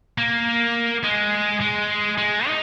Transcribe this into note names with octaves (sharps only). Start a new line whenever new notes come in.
A#3
G#3
G#3
G#3
D#4